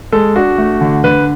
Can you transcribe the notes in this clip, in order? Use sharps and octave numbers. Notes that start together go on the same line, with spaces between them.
G#3 A4
D4 F#4
A3
D3
D3 B4